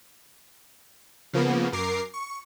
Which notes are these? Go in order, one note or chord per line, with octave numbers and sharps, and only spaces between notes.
C#3 F3 A#3 B3
F#2 A#4 D6 C7
C#6